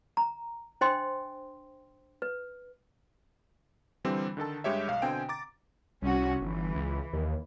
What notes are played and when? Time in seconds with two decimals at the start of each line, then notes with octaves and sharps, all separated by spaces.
0.17 A#5
0.81 D4 C5 D#5 G5 C6
2.22 B4
4.04 D3 E3 G3 C4
4.37 D3 D#3 A4 A5
4.64 G2 G#3 G4 C#5 E5
4.88 B1 F5
5.02 B2 D3 C4 G5 G#5 D7
5.29 A#5 D6 A6
6.02 C2 C#4 F#4
6.41 G1 E3
6.75 C#2
7.13 D#2